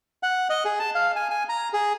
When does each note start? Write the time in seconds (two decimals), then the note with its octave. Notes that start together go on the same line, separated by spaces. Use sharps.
0.23 F#5
0.50 D#5
0.65 G#4
0.80 A5
0.95 F5
1.16 G#5
1.30 G#5
1.49 A#5
1.73 G#4